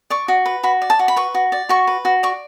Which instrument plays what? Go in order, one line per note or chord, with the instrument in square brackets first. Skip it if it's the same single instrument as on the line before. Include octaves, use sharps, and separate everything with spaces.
[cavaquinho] D5 C#6
F#4
B4
F#4 B5
D5
A5
F#4
B5
B4 C#6
F#4
D5
F#4 C#6
B4
F#4
D5 C#6